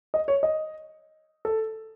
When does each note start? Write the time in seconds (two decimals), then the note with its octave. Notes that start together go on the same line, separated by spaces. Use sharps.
0.14 D#5
0.28 C#5
0.43 D#5
1.45 A4